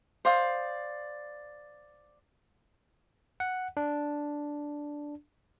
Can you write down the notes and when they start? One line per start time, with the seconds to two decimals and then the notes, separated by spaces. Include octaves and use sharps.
0.25 C5 D5 F5 D#6
3.40 F#5
3.77 D4